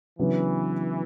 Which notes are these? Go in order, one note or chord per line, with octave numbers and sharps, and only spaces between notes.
C#3 E3 F#3 B3 D4